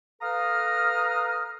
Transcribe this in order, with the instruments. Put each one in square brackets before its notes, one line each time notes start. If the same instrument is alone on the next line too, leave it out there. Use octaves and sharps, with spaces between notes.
[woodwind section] A4 B4 F5 A#5 D#6 F6